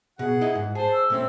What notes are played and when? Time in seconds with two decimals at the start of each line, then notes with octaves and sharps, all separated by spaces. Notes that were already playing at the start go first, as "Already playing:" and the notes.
0.19 B2 G#4 F#5
0.41 E4 D#5
0.55 G#2
0.75 G#4 C5 A5
0.93 E6
1.10 A#2 A3 C4 C#4